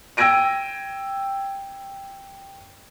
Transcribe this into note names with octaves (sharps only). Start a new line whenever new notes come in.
G5 E6 G#6 A#6 D7 D#7